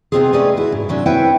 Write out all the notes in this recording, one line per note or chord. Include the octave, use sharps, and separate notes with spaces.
C3 B3 C4 D#4 F4 G#4
A3 C#4 G#4 B4 D5 D#5
E4 F#4
G#2
C3 F#3 C#4 D4
C4 E4 B4 C#5 E5 G5